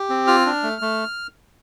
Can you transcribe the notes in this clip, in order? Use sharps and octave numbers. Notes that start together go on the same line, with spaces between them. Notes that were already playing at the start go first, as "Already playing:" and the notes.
Already playing: G4
C4
F4 F6
D4
A3
A3